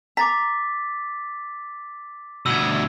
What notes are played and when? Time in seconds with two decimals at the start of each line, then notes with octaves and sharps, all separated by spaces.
0.17 A#5 D6 A6 B6
2.46 D2 B2 E6 G#6